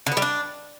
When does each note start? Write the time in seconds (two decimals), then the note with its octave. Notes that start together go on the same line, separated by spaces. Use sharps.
0.06 D3
0.12 B3
0.17 G3
0.22 D4